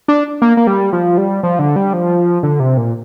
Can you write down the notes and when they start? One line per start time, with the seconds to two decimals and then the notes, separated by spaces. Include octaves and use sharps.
0.08 D4
0.42 A#3
0.57 A#3
0.67 G3
0.93 F3
1.18 G3
1.43 F3
1.59 D3
1.76 G3
1.93 F3
2.43 D3
2.60 C3
2.77 A#2